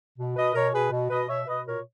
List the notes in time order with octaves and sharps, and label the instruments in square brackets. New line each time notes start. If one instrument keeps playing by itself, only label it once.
[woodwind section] B2
B2 B4 D#5
B2 A#4 C#5
B2 G#4 B4
B2
B2 B4 D#5
B2 C#5 E5
B2 B4 D#5
A#2 A#4 C#5